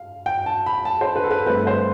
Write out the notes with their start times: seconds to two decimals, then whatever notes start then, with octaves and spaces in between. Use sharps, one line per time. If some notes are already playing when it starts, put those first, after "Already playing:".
Already playing: F5
0.26 G5
0.46 A5
0.66 B5
0.85 A5
1.01 C5
1.16 B4
1.24 A4
1.31 B4
1.46 G2 D3 A3 C4 B4
1.67 C5